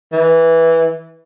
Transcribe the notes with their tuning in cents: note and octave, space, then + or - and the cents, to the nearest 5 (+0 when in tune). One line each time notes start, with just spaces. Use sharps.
E3 -10